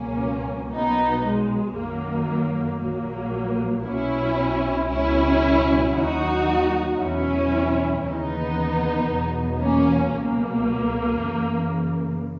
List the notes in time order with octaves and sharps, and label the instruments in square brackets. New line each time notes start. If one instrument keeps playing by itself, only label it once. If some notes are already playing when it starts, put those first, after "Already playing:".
Already playing: [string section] C#2 B2 F#3 A#3 C#4
B1 B2 F#3 B3 D#4
G#3
F#2 D#3 F#3 A#3
A#1 A#2 F#3 A#3
B1 B2 F#3 C#4 E4
C#2 B2 F#3 C#4 E4
D#2 D#3 F#3 D#4 F#4
E2 B2 F#3 C#4 E4
D#2 C#3 E3 B3 D#4
E2 B2 F#3
A#3 C#4
C#2 B2 F#3 A#3
F#2 C#3 E3